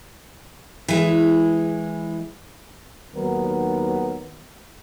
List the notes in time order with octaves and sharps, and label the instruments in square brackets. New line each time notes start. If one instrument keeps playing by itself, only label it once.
[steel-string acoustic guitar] E3 G#3
[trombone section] D#2 D#3 F#3 B3 A#4